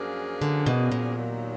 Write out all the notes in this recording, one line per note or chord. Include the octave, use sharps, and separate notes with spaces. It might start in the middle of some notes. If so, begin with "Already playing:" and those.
Already playing: F#2 F3 A#3 D4 G#4
D3
B2
A#2
D#2 D#3 F#3